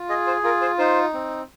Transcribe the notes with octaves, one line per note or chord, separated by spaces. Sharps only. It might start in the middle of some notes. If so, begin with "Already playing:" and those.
Already playing: F4
G#4 D#5
C5
F4 A#4
C5
D#4 C5
C4